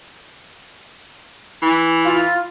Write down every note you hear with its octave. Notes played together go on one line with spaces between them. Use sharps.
E3
F4